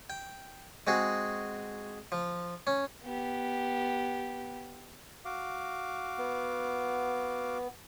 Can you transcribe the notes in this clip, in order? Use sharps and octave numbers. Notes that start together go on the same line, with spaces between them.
G5
G#3 C4 F#4 G#4
F3
C#4
B3 G4
F#4 F5 D6
B3